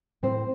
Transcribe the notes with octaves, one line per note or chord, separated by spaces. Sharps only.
A2 C4 C5